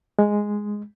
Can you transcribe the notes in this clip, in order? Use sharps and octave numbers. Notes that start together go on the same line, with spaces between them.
G#3